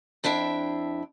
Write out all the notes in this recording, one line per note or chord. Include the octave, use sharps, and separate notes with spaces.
F2 D4 E4 E5 G5